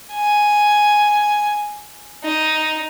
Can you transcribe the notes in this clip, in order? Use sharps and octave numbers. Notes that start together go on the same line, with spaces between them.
G#5
D#4